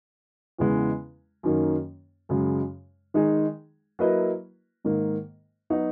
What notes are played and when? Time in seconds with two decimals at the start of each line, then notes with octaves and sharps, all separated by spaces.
0.59 E2 C#3 E3 G#3 B3
1.43 F#2 D#3 A#3 C#4
2.29 F#2 C#3 G#3
3.14 D#3 G#3 D#4 G#4
3.99 F#3 A#3 E4 B4 D#5
4.84 G#2 D#3 A#3
5.70 F#3 B3 D#4 F#4